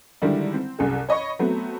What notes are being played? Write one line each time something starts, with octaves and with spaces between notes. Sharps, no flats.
D3 D#3 G3 G#3 D4 E4
C4
C2 F#2 G#4 A4
C#5 D#5 B5 C#6
F#3 A3 B3 C4